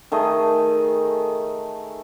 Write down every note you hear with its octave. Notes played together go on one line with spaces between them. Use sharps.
D#3 A3 G#4 D#5